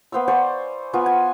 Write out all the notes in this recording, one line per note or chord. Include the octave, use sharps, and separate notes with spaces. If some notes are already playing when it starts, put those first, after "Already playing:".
B3 C5 F5 E6
C5 D5 G#5 C#6
B3 F4 G#5 C#6
G#5